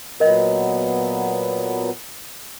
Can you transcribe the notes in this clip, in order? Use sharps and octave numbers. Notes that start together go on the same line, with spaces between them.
A#2 F#3 B3 A#4 D#5